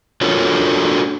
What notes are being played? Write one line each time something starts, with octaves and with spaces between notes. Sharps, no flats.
D4 F4 F#4 A4 A#4 C#5